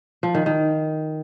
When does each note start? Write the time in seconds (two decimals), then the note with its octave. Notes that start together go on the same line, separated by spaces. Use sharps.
0.23 F3
0.35 D#3
0.46 D#3